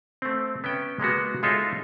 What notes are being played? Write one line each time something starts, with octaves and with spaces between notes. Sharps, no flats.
A3 C4
B3 C#4 E5 G5
G#3 A#3 B3 F#4
G#3 D#4 F4 A4 C#5 E5